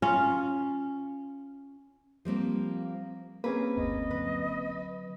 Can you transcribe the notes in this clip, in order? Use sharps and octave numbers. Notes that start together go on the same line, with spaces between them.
C#4 F4
F3 G3 A#3 C4
A#3 C4 C#4 G#4 A#4 B4
F#1 D2 G2 D#5
D3 F#3 B4